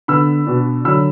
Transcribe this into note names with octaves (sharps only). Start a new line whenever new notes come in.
D3 B3 D4 B5 E6
B2 B3 D4
D3 F#3 D4 B5 E6